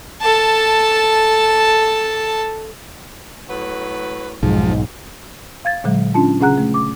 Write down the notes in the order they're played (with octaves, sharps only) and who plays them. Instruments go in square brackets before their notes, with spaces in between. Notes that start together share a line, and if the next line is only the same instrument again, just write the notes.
[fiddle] A4 A5
[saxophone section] A2 F#3 B4
[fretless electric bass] B1 [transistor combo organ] F2 F3 [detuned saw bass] G#2
[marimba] F5 G#6 A6
A#2 D3 F#3 G#3
C#4 D4 F4 A5
C#3 C#4 G#4 F#5 A#5 F#6
A3
D6